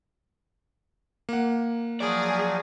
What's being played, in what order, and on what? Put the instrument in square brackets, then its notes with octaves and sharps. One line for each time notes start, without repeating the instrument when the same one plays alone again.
[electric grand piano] A#3 F#5
[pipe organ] F3 F#3 [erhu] G#4 [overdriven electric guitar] D5